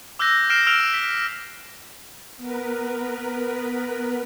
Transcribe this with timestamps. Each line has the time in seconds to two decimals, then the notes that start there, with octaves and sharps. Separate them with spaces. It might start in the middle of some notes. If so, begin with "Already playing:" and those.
0.19 D6 E6 F#6 G6 A#6
0.50 F6 A#6 C7 D7 E7
0.67 E6 F6 D7 F7
0.80 E6
0.94 B6
2.38 B3 A#4 B4